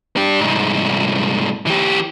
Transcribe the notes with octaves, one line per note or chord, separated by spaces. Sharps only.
D4 G4
C2 G#2
E3 G4